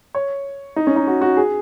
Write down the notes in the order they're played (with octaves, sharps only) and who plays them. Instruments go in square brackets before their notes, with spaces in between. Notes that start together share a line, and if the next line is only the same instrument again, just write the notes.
[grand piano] C#5
D#4
C#4
D#4
F#4
F#4
G#4